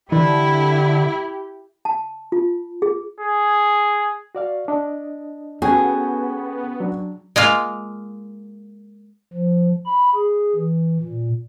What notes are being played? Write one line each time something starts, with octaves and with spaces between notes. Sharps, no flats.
D3 E3 E4 G4
A5
F4
G#4
G#4
F#4 D5 F5
D4 D#5
B3 C#4 F#4 G#4 A4 G5 G#6
F#3 D4
G#3 A#3 F4 F5
F3
B5
G#4
E3
A#2